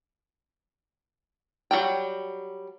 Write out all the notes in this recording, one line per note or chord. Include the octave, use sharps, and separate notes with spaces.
F#3 G3 G5